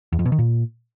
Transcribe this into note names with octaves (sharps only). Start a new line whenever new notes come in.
E2
F2
B2
D#3
A#2